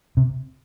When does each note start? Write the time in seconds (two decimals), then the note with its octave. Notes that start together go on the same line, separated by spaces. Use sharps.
0.17 C3